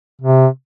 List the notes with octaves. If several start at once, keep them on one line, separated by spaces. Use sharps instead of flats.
C3